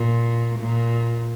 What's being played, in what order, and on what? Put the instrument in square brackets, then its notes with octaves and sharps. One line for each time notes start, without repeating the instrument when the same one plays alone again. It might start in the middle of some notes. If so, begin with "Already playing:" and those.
Already playing: [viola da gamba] A#2
A#2